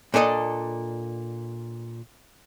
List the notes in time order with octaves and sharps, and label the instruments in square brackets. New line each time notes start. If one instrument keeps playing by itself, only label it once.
[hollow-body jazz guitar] A#2 D4 A4 D#5